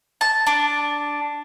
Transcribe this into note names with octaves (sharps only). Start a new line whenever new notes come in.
A5
D4